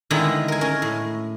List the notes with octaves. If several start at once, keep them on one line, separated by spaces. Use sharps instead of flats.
D3 D#3 G#3 B3 E4 A#5
A#4 G#5
C#4 A#4
A2